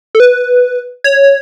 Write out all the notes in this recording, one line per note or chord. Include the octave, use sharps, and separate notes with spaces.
A4
B4
C#5